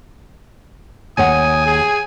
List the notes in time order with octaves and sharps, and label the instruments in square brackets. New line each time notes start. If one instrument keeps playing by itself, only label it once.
[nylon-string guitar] D#2 C#5 F#5 [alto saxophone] G#5 [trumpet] D#6
[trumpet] G#4